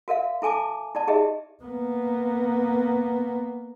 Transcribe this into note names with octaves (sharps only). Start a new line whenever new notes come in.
F#4 A#4 E5 F5
E4 A4 G#5 A5 D6
E4 D5 A5
D#4 G4 G#4 D#5 E5
A#3 B3